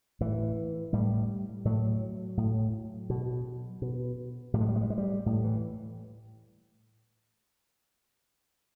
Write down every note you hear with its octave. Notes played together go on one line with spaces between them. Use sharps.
A2 E3
A2 G3
A2 F#3
A2
B2
B2
A2 G3
G#3
G3
G#3
G3
G#3
G3
A2
E3